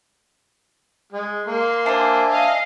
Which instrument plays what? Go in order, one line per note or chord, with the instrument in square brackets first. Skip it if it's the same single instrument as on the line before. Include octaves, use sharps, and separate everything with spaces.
[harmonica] G#3
[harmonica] A#3 [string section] C6
[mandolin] D4 C5 [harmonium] E5 G#5
[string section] D#5 F5